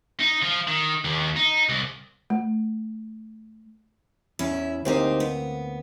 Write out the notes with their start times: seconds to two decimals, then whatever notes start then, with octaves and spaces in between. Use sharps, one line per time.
0.20 D#4
0.43 F3
0.68 D#3
1.04 D#2
1.36 D#4
1.69 C2
2.30 A3
4.39 E2 C#4 E4
4.85 D2 A#3 C4 D#4 G4 C5
5.20 B3